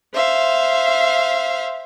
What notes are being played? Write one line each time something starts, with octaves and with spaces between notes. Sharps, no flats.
C5 E5 F5